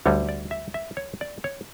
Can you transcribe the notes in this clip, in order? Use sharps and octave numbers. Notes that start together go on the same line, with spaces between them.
D2 D3 G3 C#5
D5
E5
E5
C#5
D5
C#5